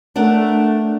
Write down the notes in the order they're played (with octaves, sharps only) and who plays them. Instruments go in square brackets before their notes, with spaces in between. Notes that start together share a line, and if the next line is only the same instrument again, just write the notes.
[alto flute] A3 [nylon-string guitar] D4 A#4 F#5